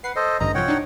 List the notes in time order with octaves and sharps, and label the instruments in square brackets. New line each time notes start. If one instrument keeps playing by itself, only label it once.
[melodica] B4 F#5 [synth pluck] C7
[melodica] A4 C5 D#5
[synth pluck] A1 G2 D3 [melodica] D#5 A#5
[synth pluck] C2 F3 [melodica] C#5 F#5 G5
[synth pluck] D4 D#4